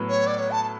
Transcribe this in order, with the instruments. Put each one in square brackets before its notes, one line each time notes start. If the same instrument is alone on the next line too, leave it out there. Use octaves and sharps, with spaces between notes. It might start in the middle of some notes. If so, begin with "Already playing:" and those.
Already playing: [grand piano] A2 F#3 B3 E4 B4
[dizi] C#5
D5
C#5
A5
A5